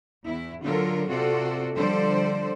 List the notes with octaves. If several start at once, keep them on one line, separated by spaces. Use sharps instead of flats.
E2 E4
D3 F#3 F4 A4 A#4
C3 F4 F#4 A4 D5
D3 F3 G3 A4 C5 D5